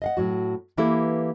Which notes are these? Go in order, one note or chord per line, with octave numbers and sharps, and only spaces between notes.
D#5 F5 F#5
A2 F#3 F#4
E3 A#3 E4 G4 A4 B4